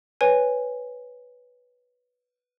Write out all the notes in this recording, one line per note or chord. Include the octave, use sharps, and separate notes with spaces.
B4 C#5 G#5